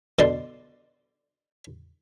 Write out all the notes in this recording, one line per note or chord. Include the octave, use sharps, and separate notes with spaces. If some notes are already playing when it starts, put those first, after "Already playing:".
B2 D3 D5 C6